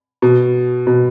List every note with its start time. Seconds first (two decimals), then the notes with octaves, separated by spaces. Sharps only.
0.22 B2
0.87 B2